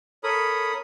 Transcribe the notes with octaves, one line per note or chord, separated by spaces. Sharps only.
A4 A#4 C#5 B5 D#6